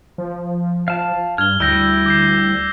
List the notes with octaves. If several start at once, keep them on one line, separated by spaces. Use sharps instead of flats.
F3
F5 A5
G2 F6 G#6 G7
D2 G3 E4 G4 E6 G6 A#6
D6 G6 C7